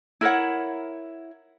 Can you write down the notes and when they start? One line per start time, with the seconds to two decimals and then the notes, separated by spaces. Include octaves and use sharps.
0.21 E4 A#4 C#5 F#5